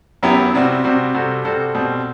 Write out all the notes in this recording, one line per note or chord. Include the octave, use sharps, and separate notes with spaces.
F#2 F#3 B3 E4 G4
C3 G3 C4 F#4
C3 G3 C4 F#4
C3 G3 C4 F#4 A4
C3 G3 C4 F#4 A4
B2 G3 C4